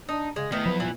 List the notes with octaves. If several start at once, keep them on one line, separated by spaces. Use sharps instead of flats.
D4 D#4
C#3 G#3
D#3 A3 B3 D#4 E4
F3 F#3 B4
A#2 E3